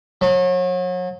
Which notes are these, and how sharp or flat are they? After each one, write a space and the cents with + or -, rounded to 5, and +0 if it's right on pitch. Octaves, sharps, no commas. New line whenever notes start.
F#3 -35